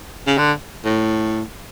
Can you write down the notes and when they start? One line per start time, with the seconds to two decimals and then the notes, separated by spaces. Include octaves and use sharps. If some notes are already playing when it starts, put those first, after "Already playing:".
0.27 C#3
0.38 D3
0.85 A2